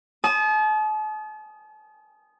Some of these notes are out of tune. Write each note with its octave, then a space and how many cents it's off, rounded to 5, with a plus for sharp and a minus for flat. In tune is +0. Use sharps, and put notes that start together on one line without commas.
A5 -40 D#6 -5